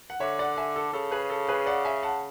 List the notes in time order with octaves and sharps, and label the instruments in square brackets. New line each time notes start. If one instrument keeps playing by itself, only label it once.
[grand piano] F#5
[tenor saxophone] D3 [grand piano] C#5 E5
[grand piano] D5 F#5
E5 G#5
A4
[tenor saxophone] C#3 [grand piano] A4
[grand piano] G#4 B4
A4
G#4 B4
D5 F#5
E5 G#5
F#5 A5